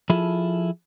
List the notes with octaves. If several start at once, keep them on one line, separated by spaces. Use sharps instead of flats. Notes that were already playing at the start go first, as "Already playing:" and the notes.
F3 E4 F4 G#4 A4